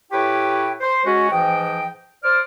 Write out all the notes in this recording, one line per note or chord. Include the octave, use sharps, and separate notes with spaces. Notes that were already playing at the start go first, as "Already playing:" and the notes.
A2 E4 G4 B4 C#5 G5
C5
G#3 C#4 F#4
G#2 E3 F3 D#5 G5
C5 D5 F6